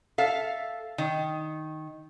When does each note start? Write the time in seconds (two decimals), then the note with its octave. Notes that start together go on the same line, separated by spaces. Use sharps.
0.18 A4 E5 F5
0.98 D#3